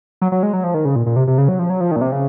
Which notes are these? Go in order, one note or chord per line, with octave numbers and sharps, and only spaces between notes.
F#3
F#3
G#3
F#3
F3
D#3
C#3
A#2
A#2
C3
C3
C#3
F#3
F3
F#3
F3
D#3
A#2
C3
C#3